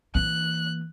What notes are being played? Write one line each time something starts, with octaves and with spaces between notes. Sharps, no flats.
E3 A#3 F#6